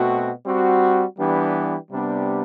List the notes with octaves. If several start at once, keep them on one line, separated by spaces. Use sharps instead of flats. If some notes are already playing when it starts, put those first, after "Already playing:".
Already playing: B2 A3 C4 F#4
G3 C4 F#4
E3 G3 B3 D4 G4
C3 G3 B3 D4 G4